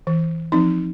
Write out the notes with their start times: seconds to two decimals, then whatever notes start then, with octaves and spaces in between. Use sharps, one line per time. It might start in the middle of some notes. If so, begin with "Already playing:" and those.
0.07 E3
0.52 F3 C4 D#4